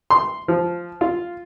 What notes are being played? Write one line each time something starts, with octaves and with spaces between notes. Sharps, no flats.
C6
F3
F4